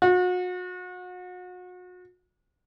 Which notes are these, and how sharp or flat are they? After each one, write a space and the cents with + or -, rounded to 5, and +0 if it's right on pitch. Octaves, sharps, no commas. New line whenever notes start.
F#4 -35